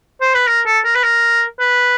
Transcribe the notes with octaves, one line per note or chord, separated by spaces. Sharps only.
C5
B4
A#4
A4
A#4
B4
A#4
B4